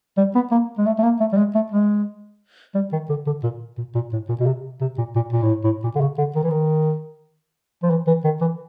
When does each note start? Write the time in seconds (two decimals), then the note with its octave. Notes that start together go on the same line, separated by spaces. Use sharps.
0.17 G3
0.35 B3
0.52 A#3
0.78 G#3
0.86 A3
0.98 A3
1.03 A#3
1.20 A3
1.33 G3
1.38 G#3
1.55 A3
1.72 G#3
2.75 G3
2.92 D#3
3.09 D3
3.27 D3
3.43 A#2
3.78 A#2
3.95 A#2
4.13 A2
4.29 A#2
4.40 B2
4.46 C3
4.81 C3
4.98 A#2
5.16 A#2
5.33 A#2
5.43 A2
5.64 A2
5.84 A#2
5.95 D3
6.01 C#3
6.18 D3
6.36 D#3
6.43 E3
6.50 D#3
7.83 F3
7.90 E3
8.07 E3
8.24 D#3
8.41 E3